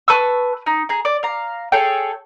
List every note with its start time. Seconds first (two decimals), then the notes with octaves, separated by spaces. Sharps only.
0.08 B4 A5 C#6 E6
0.66 D#4
0.89 G#4 A#5
1.05 D5
1.23 F5 A#5
1.72 G#4 A4 C#5 G5